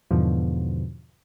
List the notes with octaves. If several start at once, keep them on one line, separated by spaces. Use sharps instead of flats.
E2 G#2 B2 D3 F3